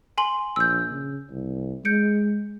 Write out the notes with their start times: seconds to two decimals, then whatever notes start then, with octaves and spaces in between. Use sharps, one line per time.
0.18 G#5 C6 F#7
0.56 A#1 E6 G6
0.91 C#3
1.31 C2
1.85 G#3 G6 C#7 D7